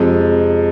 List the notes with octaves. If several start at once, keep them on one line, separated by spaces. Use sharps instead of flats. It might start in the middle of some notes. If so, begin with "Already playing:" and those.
Already playing: F2 C3 F3 G#3